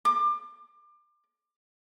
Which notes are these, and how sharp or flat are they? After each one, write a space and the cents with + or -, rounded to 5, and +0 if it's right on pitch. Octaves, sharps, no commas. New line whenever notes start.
D6 +30